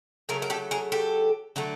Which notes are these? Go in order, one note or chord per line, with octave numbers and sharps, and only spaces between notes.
C#3 F#3 A3 G#4 A#4
A#4
G4 A4
G#4 A#4
G4 A4
D3 F#3 A3